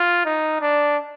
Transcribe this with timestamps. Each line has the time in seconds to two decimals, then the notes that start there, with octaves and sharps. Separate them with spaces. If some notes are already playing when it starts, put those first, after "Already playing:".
Already playing: F4
0.26 D#4
0.61 D4